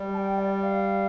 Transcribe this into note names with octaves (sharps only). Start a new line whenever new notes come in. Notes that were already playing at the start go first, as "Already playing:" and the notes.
Already playing: G3
A5
G5
D5
F5